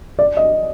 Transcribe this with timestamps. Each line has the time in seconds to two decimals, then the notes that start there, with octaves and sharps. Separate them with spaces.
0.19 D5
0.37 D#5